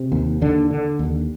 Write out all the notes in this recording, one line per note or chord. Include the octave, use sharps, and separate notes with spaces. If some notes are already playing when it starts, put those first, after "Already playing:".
Already playing: C3 C4
D#2
D#2 D3 D4
D3
D#2